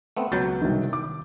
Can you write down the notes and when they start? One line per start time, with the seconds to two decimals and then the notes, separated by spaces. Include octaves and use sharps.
0.17 A3 B3 C4
0.32 C#2 B2 F#3 G6 A6
0.62 C2 D#3
0.93 D6